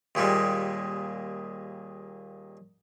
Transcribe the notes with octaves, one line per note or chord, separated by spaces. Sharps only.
D#2 A#2 G3 G#3